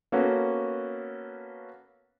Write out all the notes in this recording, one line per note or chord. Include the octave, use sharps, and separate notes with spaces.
A#3 B3 C#4 F#4 A4